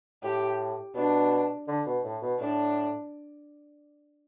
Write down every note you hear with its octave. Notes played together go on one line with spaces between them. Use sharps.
A2 G4
B2 D4
D3
B2
A2
B2
A2 D4